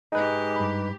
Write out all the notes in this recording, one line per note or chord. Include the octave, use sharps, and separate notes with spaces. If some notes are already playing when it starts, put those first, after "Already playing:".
G#2 G#3 D#4 G4 B4
G2 B5